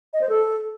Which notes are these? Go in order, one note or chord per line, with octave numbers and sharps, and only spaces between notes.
D#5
C5
A4